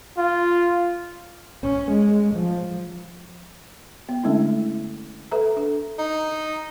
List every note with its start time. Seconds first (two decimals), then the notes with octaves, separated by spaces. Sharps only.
0.18 F4
1.63 C#4
1.92 G#3
2.35 F3
4.09 B3
4.24 D3 G#3 A3 C#4 D4 E4
5.31 A4 B4 E5 A#5
5.56 D4 A4
5.99 D#4